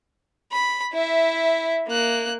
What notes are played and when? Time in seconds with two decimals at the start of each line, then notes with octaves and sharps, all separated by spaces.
0.52 B5
0.93 E4 E5
1.87 A#3 F#6